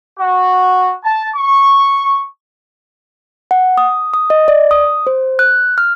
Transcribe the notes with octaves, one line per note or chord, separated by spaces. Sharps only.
F#4
A5
C#6
F#5
D#6
D#6
D#5
D5
D#6
C5
F#6
F6